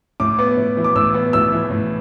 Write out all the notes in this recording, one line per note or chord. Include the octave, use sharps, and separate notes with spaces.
A2 D6
B3
A2
E3
D6
A2 E6
B3
A2 E6
E3
A2